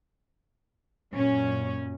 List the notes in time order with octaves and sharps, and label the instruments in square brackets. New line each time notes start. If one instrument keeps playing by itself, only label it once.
[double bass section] F#2 A#2 [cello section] C#4